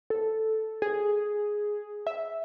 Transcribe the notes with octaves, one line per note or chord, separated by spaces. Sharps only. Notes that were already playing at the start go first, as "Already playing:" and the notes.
A4
G#4
E5